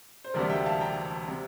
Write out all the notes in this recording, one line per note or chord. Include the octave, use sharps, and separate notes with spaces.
C5
E1 D2 C3 G3 A#4 D5
E5 G5
F5 A5
G5 A#5
C3